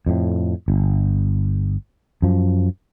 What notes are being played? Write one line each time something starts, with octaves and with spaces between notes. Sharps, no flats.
F2 A2
G1
F#2 F3